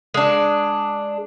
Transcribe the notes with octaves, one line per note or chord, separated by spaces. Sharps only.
G#3 D4